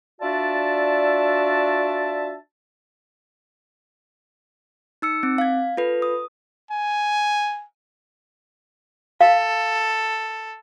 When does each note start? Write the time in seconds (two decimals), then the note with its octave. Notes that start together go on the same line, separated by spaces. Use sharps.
0.21 D4 F4 F#4 D5 E5 A5
5.02 D#4 E6 C#7
5.23 C4
5.38 F5 G#6
5.77 F4 A4 B4
6.02 D#6
6.71 G#5
9.21 A4 F5